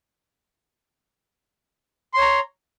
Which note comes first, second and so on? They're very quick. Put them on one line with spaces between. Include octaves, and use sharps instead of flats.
C6 C#5 A#5